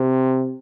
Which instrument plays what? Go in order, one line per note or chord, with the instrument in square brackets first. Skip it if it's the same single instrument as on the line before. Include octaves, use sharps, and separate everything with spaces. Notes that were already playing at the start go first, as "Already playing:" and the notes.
Already playing: [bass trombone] C3